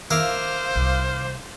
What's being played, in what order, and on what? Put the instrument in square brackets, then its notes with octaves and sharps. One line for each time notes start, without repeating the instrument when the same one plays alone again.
[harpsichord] E4 A#4 [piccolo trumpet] C5 [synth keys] F5 D6 F6
[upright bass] C2